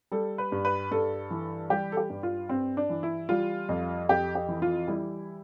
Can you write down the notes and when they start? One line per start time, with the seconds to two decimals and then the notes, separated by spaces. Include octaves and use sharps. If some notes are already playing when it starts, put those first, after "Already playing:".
0.12 G3 A4
0.38 B4
0.52 G2
0.65 B4
0.91 G2 A4
1.31 E3
1.70 G3 G4
1.92 A4
1.97 G4
2.10 G2
2.23 F4
2.49 G2 C4
2.77 D4
2.90 E3
3.03 E4
3.29 G3 F4
3.69 F2
4.09 F2 G4
4.35 G4
4.48 E3
4.62 F4
4.88 G3 E4